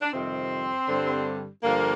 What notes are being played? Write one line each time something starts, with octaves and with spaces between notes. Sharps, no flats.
D4
F2 C3 D#3 G3 C4
G2 D3 G3
G2 D3 F3 A#3